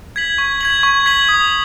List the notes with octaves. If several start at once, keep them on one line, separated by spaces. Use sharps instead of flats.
G#6 B6 F#7
C#6
G#6 B6 F#7
C#6
G#6 B6 F#7
D#6